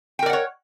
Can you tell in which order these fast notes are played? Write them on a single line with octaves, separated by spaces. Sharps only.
G5 A#4 D5 F#5 C#5